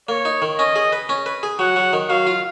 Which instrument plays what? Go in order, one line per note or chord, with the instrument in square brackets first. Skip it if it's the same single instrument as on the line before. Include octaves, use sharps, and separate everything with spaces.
[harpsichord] A#3 [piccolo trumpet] C#5
[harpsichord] D#4
D#3
[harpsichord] C#4 [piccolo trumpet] D#5
[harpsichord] G#4
B4
C#4
B4
G#4
[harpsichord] F#3 [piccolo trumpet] F#5
[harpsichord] F#3
D#3
[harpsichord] F#3 [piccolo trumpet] F5
[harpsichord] F4